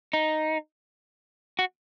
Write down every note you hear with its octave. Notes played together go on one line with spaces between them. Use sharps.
D#4
F#4